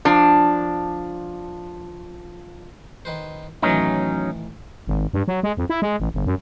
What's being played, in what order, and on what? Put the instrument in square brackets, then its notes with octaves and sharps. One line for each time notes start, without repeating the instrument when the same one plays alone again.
[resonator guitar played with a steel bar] F3 D4
[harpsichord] D#3 B4 C5
[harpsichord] A2 D#3 E3 [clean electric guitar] F#3 C#4 D#4
[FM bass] G#1
G2
F#3
G#3
F2
E4
G#3
A1
G1
F#2